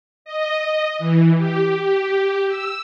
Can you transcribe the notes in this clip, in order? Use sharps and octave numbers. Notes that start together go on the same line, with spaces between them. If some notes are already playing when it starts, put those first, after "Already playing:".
D#5
E3
G4
G4
E6